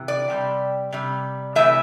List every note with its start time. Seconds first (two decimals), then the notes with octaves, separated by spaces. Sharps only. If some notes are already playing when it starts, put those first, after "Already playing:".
Already playing: C3 E3
0.08 D5
0.30 C3 G3
0.93 C3 G3
1.56 C3 E3 A3 E5